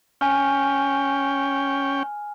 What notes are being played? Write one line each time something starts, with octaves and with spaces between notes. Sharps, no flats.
C#4 G5 G#5 F6